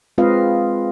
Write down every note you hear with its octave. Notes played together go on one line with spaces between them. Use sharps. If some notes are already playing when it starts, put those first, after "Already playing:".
G#3 C4 F4 B4 D#5 F5